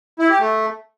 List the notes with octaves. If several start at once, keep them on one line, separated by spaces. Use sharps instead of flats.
E4
G4
A3